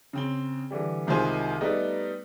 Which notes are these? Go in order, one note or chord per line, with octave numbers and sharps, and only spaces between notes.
C#3 C4 G7
D3 E3 G3
C2 D#3 G#3 F4 C5 G#5
G3 A3 B3 D#4